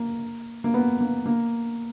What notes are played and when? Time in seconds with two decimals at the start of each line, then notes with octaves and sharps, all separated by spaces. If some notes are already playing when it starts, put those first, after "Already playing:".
Already playing: A#3
0.64 A#3
0.74 B3
1.01 A#3
1.26 A#3